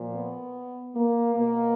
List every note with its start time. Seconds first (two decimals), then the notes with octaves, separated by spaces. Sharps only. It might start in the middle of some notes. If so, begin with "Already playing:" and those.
Already playing: A#2 F3
0.14 B3
0.95 A#3
1.35 B2 A#3